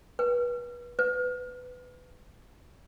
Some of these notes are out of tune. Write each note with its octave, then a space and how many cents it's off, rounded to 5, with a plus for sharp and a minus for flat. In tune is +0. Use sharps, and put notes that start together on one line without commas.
B4 -30
B4 +20